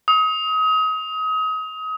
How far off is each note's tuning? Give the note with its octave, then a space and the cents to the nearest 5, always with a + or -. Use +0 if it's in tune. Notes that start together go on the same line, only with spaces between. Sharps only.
D#6 +30